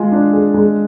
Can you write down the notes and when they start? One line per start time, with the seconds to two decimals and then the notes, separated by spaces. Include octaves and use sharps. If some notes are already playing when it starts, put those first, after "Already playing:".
Already playing: G#3 F4 G#4
0.12 D4
0.33 G#4
0.54 G#3